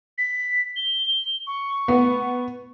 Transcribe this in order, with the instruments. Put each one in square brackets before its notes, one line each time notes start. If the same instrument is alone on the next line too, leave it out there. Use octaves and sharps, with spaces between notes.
[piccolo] B6
G7
C#6
[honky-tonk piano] B3